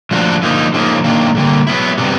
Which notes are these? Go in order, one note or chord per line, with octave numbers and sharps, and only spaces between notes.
F3 A3 D4 F#4
D3 F3 A#3 D#4
C#3 F3 A#3 D#4
D#3 F#3 A#3 D4
D3 G3 A#3
F#3 B3 E4
C3 E3 G3 B3